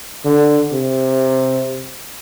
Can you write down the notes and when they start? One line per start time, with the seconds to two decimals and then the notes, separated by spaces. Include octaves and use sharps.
0.25 D3
0.72 C3